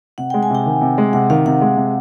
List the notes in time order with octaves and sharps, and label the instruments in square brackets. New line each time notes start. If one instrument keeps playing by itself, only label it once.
[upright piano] C3 [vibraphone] F#5
[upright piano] G#3 [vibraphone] G5
[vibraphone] G#5
[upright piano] C3 [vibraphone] G5
[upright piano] D#3
C3
G#3
[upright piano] C3 [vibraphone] F#5
[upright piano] D#3 [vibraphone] F5
[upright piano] C3 [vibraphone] F#5
[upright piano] G#3
C3